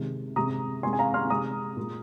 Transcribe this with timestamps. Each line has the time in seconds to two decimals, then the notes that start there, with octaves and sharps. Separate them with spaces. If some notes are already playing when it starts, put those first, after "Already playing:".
Already playing: C3 D#3 G#3
0.36 C3 G#3 A#5 D#6
0.83 C3 G#5 C6
0.87 G#3
0.93 G#5
0.99 F5 A#5
1.14 C6 F6
1.30 C3 G#3 A#5 D#6
1.77 A#2 G#3